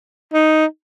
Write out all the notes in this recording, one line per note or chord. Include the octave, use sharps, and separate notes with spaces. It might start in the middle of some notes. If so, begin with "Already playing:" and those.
D#4